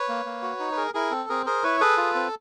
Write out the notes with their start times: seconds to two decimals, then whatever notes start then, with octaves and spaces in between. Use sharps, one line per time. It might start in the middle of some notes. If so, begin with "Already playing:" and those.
Already playing: B4 C#5
0.09 A#3
0.26 A#3
0.42 F#4
0.59 D#4
0.72 B4
0.77 G#4 A#4
0.94 E4 G#4 A#4
1.11 C4 A4
1.29 C4 G#4 A#4
1.46 G#4 A#4 C5
1.64 E4 B4 C#5
1.81 G#4 A4 B4
1.97 F4
2.15 C4